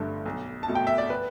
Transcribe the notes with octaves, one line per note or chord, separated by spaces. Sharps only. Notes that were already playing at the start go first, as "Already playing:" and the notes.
Already playing: G1 G2 D3 A3
B1
A5
B2 A3
G5
E5
D5
B4